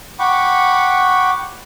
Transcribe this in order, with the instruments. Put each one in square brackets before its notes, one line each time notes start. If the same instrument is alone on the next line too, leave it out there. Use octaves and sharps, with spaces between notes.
[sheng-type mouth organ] F#5 G5 B5 C#6 D6